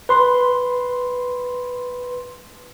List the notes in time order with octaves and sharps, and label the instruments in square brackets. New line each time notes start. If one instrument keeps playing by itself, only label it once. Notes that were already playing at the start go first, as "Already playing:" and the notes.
[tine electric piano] B4 C6